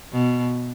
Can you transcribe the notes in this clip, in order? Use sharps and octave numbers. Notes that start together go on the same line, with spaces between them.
B2